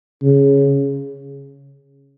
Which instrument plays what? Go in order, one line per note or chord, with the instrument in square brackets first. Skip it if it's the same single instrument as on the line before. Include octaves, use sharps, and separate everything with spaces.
[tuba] C#3